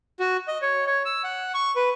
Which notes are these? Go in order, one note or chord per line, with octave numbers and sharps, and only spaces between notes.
F#4
D#5
C#5
C#5
E6
F#5
C#6
B4